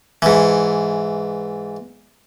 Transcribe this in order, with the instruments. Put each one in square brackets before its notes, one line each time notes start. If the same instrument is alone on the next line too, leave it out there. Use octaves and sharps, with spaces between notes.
[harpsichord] G#2 E3